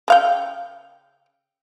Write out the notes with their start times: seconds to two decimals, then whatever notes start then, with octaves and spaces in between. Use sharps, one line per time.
0.08 C#3 F5 G5